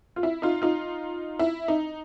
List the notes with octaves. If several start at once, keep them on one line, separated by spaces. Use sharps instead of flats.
F4
E4
D#4 F4
D#4 F4
E4
D#4